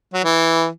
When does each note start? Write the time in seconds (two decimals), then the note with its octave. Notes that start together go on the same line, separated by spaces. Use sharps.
0.14 F#3
0.24 E3